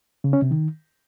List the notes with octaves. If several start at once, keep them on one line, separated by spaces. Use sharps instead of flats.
C#3
C#4
C3
D#3